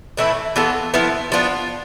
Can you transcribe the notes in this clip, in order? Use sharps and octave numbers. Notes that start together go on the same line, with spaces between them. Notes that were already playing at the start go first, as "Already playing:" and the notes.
A2 E3 A3 E4
E3 B3 F4 A4
F3 B3 E4
F3 B3 D4 F4